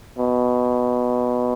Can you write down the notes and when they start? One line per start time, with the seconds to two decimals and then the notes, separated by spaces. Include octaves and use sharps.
0.18 B2